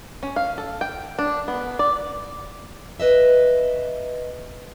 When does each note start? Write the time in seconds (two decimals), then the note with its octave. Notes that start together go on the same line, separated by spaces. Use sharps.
0.23 C#4
0.36 F5
0.58 A4
0.81 G5
1.19 D4
1.48 B3
1.79 D5
3.00 B4 D#5 E5